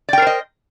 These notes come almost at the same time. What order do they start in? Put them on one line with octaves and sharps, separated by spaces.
D5 G5 A#4 C5 D#5